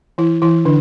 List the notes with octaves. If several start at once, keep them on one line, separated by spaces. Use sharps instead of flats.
E3 E4
E3 E4
D3 D4